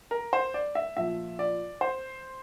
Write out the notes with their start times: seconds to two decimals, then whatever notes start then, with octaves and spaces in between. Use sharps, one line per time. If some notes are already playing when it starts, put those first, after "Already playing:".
0.11 A#4
0.33 C5
0.54 D5
0.75 E5
0.97 A#2 F3 E5
1.39 D5
1.81 C5